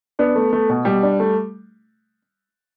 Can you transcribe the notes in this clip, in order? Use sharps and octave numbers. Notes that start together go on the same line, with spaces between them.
B3 D4
A3
A3
B2
B2 G3
D4
A3